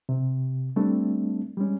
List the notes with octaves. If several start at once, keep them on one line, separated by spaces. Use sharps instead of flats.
C3
G3 A3 C4 D4
G3 G#3 C#4